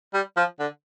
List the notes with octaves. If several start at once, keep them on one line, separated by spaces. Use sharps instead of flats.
G3
F3
D3